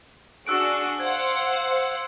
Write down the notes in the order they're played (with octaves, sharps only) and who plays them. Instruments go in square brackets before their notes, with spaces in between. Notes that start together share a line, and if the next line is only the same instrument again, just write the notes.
[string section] D4 F#4 G#4 [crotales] E6 F#6 D7
[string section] C5 F5 F#5 [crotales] G#6